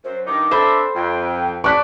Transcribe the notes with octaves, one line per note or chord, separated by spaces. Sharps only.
F#2 C5
G2 D#3 D#4 D6
C4 D4 A4 C5 E5 B5
F2 G5
D5 A5 C#6 F#6 B6